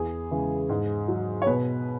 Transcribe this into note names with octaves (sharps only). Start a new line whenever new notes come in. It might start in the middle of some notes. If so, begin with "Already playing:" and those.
Already playing: E2 G#4
C#3 E3 G#3
G#2
F#3
C#5
B2 B4